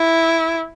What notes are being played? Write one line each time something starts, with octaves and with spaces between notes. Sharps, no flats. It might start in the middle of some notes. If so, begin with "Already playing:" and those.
Already playing: E4